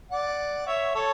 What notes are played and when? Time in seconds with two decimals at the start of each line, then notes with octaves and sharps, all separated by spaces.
0.11 D5 F#5
0.67 C#5 E5
0.95 A4 C#5